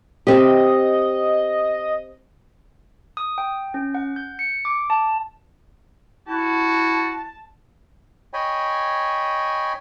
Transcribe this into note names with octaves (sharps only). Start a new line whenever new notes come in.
C4 G4 D#5
D#6
G5
C#4
F#5
G6
C#7
D6
A5
E4 F#4 A5
C#5 D#5 G5 G#5 B5